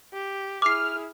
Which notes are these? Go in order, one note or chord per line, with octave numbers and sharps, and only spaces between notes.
G4
E4 G#4 D6 F6 C7